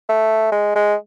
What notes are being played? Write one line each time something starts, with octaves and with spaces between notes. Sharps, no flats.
A3
G#3
G#3